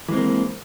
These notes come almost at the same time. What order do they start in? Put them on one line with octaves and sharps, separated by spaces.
E3 G#3 C4 A#3